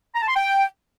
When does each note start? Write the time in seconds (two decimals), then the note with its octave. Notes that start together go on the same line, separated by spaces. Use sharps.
0.15 A#5
0.22 A5
0.28 C6
0.35 G5